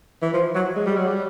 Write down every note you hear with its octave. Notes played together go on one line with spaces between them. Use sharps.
E3
F3
F#3
G#3
G3
F#3
G3